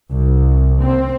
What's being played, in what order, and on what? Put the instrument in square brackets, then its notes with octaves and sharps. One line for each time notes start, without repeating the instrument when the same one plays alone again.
[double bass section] C2
C4